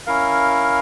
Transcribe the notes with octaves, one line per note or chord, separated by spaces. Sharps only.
C#4 E4 A#4 F5